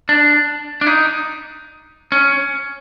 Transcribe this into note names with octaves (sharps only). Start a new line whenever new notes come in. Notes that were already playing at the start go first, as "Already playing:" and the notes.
D4
D4
D#4
C#4